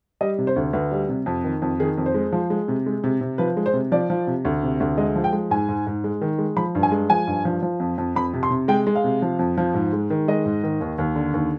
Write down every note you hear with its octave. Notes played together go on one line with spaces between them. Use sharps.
G3 D#5
C3
C5
D2
D2 B4
G3
C3
F2
D#3
F2
D#3 G#4
F2
C5
G#3
F3
G#3
C3
G#3
C3
C3
F3 B4
G#3
C5
C3
F3 D5
F3
C3
D2
C3
D2
G#3 D#5
F3
G5
G#3
G#2 G#5
G#2
G#2
G#3
D#3
G#3
F3 B5
G2
G#5
G#3
F3 G#5
G2
F3
F3
F2
F2
F2 B5
C3
C6
C3
G#3 G5
G#3
F5
C3
F3
F2
F3
G#2
G#3
D#3
G#3 D#5
G#2
D#3
D#2
D#2
D3
D#2